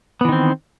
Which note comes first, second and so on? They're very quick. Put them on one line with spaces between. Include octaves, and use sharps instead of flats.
B3 E3 D#3 C4